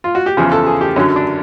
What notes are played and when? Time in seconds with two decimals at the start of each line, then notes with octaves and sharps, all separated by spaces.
0.04 F4
0.15 F#4
0.26 G4
0.37 E2 C#3 F3 G#4
0.52 A4
0.67 G#4
0.81 G4
0.96 F#2 D3 F#3 C#4
1.16 D4